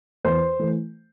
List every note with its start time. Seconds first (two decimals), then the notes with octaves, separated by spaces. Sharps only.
0.24 E2 C5
0.59 E3 A3